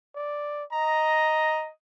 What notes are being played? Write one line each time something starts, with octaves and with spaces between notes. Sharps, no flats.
D5
D#5 A#5